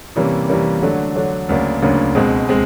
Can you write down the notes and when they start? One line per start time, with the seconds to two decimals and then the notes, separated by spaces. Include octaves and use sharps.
0.16 C3 E3 G3 A#3 C#4
0.48 C3 E3 G3 A#3 C#4
0.82 D3 F#3 A3 D4
1.15 D3 F#3 A3 D4
1.49 D2 C#3 F#3 A#3 D4
1.82 D2 C#3 F#3 A#3 D4
2.15 C#2 B2 G#3 C4
2.49 G#3 C4